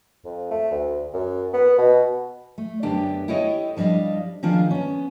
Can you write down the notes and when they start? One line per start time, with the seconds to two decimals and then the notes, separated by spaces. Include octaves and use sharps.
0.25 F2
0.50 A3
0.71 D2
1.13 F#2
1.53 B3
1.78 B2
2.58 A3
2.83 F#2 D3 B3 D4 G4 G5
3.28 E4 G4 A4 C#5 D#5
3.77 F3 G3 D4 D#5 F5
4.43 D#3 F3 D4 F4 G#4
4.71 B3 C#4